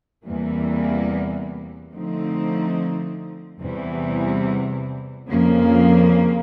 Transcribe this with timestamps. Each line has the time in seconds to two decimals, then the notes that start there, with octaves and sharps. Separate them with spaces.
0.25 E2 C3 E3 G3 A#3
1.93 D3 F3 A3 C4 D#4
3.61 E2 C3 E3 G3
5.28 F2 C#3 F3 A#3